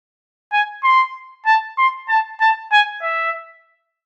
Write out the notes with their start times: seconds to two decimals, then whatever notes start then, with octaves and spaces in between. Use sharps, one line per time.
0.52 G#5
0.84 C6
1.46 A5
1.78 C6
2.08 A5
2.40 A5
2.72 G#5
3.02 E5